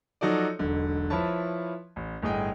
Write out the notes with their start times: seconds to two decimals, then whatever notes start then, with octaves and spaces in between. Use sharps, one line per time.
0.21 F3 F#3 D#4 F#4 A4 D5
0.59 E1 B1 D3
1.10 F3 E4 B4 C#5 A5
1.96 A1
2.22 G1 A2 G#4 D#5 G5